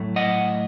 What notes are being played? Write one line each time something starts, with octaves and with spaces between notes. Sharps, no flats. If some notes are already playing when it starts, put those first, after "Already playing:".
Already playing: A2 F#3 A3
D#5 F#5